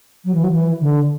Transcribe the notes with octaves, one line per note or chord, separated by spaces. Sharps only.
F#3
E3
F#3
E3
D3